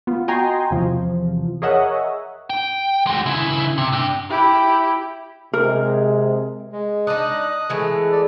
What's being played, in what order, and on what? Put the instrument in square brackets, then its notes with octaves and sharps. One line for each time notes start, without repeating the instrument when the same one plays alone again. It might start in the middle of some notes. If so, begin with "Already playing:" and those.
[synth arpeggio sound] B3 F4
F#4 D#5 G5 G#5 A#5 C6
E2 C3 F3
G#4 A#4 C#5 D#5 E5 F#5
[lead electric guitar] G5
G#3 F#4
C#3 E4
C3
D4 G5
[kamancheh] E4 G4
[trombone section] C3 G#3 [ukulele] A#4
[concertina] G#3
[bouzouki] D4 D#4 [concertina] D#6 F#6
[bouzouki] E3 G#3 A3
[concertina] A4 D5